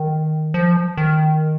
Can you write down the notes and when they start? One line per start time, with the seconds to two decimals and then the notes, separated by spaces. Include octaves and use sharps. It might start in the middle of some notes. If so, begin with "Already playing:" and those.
Already playing: D#3
0.54 F3
0.97 D#3